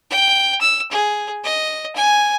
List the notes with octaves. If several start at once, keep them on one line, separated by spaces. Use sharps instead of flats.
G5
E6
G#4
D#5
G#5